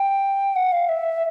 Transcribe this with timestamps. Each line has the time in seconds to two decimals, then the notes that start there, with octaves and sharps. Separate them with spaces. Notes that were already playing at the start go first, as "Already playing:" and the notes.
Already playing: G5
0.56 F#5
0.72 F5
0.89 E5